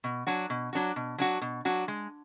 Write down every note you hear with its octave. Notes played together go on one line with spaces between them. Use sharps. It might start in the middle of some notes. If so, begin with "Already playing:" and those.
B2
F#3 D4 F#4
B2
F#3 D4 F#4
B2
F#3 D4 F#4
B2
F#3 D4 F#4
G#3